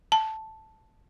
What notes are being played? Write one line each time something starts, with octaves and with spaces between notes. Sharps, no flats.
A5